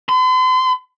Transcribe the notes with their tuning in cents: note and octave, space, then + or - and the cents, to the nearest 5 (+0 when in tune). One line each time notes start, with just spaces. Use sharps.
C6 -45